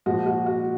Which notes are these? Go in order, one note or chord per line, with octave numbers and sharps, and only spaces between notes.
A#2 F3 G#3 F#4
F#4
F#4